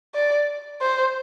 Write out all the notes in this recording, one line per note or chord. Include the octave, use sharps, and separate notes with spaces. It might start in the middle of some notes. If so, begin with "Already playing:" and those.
D5
C5